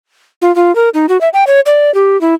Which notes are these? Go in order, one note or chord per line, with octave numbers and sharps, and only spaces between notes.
F4
F4
A#4
D#4
F#4
E5
G5
C#5
D5
G4
E4